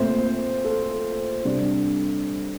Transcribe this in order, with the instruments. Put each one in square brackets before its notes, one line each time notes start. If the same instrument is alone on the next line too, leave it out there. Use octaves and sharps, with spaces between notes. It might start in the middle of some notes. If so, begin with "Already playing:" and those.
Already playing: [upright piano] A#2 A3 C4 C5
A4
C3 G3 D4